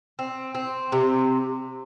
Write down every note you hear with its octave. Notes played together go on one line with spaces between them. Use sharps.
C4
C4
C3